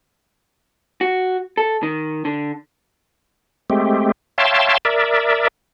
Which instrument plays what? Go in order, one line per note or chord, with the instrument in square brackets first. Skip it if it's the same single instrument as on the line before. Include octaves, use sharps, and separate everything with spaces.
[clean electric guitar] F#4
A4
D#3
D3
[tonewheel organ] G#3 A3 C4 G4
C#5 E5 F5 G5 A5 C6
A#4 D5 E5